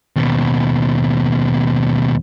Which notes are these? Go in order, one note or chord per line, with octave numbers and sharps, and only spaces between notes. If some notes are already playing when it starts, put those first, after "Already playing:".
D#2 B2